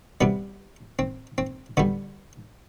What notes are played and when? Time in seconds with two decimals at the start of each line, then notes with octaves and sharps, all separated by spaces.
0.21 C3 G3 B3
0.99 C4
1.38 C4
1.77 D3 G3 B3